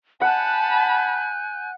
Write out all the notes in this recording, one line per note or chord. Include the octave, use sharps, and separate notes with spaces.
F#5 G#5 A5 B5 F#6 G6